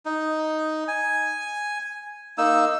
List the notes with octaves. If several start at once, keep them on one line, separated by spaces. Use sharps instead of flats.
D#4
G#5
A#3 D#4 E6